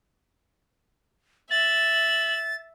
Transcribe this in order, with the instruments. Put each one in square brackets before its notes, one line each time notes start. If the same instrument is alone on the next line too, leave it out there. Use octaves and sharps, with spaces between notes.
[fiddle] E5 [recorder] A6 [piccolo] F#7